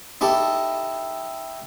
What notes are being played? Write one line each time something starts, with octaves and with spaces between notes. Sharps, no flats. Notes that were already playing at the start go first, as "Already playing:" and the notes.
D#4 E4 G4 A4